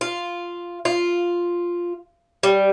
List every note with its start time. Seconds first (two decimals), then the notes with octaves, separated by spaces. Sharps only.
0.01 F4
0.85 F4
2.43 G3